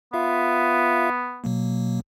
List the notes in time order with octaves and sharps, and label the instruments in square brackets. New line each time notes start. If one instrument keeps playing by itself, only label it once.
[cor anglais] B3 [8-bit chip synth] F4 E5 F5
[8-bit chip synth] B2 F#3 A#3